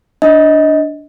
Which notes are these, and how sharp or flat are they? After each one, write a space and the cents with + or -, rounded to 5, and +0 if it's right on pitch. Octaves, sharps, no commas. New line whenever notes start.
D4 -5 D#5 +20